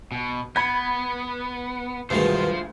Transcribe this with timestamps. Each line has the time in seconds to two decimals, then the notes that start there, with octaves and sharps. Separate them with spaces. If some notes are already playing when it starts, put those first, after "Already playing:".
0.12 B2
0.56 B3 B5 G#6
2.10 D2 G2 B2 D#3 G#3 F4 C5